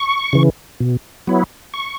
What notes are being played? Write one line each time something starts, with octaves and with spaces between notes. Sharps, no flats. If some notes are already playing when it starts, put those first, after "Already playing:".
Already playing: C#6
C#3 E3
B2
F#3 B3 E4
C#6